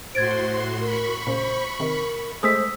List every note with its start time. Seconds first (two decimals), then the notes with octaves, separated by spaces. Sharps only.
0.15 A2 F#4 C5 C6 G#6 A6 D7
0.81 A#4 B5 C#6
1.27 A#2 C#3 C5
1.80 C3 D#3 A#4
2.43 G#3 A3 C5 D#6 E6 B6